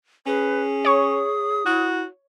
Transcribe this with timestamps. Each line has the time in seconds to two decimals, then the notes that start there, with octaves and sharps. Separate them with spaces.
0.26 C#4 G#4 B4
0.85 C#5 C#6 D#6
1.66 E4 F#4